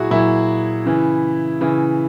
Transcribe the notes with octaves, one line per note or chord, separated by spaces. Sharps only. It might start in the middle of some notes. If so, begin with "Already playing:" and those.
Already playing: A#2 F#3 E4 F#4 G#4
A#2 F#3 E4
C#3 E3
C#3 E3